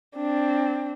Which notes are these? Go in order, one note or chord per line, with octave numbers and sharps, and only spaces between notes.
C4 D4